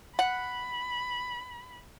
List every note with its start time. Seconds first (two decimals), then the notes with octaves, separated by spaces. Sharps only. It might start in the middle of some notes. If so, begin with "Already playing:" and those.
0.19 F#5 B5